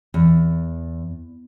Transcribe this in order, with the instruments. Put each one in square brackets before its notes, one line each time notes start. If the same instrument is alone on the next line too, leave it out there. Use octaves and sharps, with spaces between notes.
[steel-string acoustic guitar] E2